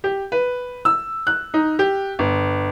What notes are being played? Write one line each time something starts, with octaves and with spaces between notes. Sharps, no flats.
G4
B4
E6
F#6
D#4
G4
G1